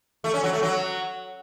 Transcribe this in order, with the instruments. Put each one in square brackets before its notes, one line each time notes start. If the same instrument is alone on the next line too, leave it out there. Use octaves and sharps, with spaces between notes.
[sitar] A3
C#4
F#3
A3
F#3